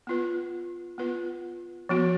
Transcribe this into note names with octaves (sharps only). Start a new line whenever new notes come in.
B3 F4 B4
B3 F4 B4
F3 B3 F#4